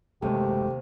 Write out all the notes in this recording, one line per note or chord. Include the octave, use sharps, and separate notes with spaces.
F#1 D#2 C3 G#3 A3 G4